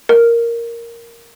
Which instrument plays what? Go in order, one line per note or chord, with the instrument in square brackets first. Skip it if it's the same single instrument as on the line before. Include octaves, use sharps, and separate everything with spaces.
[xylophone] A#4